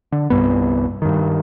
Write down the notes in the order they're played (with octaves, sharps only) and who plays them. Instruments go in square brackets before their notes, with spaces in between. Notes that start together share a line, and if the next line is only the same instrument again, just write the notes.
[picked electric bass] D3
C2 G2 B3
G2 D#3